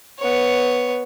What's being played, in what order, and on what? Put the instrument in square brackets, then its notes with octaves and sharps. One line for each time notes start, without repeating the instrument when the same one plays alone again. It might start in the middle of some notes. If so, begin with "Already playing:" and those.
[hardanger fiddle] B3 C#5